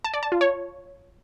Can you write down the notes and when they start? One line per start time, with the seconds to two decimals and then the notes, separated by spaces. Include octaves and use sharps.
0.04 A5
0.14 D5
0.23 A5
0.32 F4
0.41 C#5